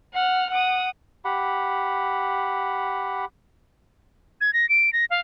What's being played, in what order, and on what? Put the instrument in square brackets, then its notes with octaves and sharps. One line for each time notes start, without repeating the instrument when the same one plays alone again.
[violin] F#5 F6
F#5 D#6
[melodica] G4 F#5 B5
[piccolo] G#6
A#6
D7
A#6
F5